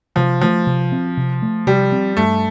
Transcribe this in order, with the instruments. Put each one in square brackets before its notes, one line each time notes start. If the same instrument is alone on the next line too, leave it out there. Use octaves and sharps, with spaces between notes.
[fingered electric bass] C3 [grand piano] F3
[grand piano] F3 [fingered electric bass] A3
[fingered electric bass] C3
C4
C3
A3
[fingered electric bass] C3 [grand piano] G3
[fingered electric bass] C4
[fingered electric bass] G2 [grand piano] A3